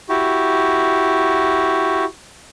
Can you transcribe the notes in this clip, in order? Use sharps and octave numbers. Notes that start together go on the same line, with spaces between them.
E4 F#4 G4